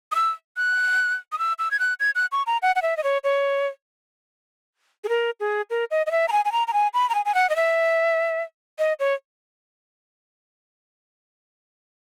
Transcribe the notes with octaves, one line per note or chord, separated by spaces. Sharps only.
D#6
E6
F#6
D#6
E6
E6
G#6
F#6
G#6
F#6
C#6
A#5
F#5
F#5
E5
D#5
C#5
C#5
G#4
A#4
G#4
A#4
D#5
D#5
E5
A#5
G#5
G#5
A#5
A#5
G#5
B5
A#5
G#5
G#5
F#5
D#5
E5
D#5
C#5